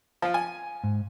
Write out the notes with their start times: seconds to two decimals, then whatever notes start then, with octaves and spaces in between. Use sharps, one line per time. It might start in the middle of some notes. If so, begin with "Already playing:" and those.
0.22 F3 F4
0.34 G#5
0.84 G#2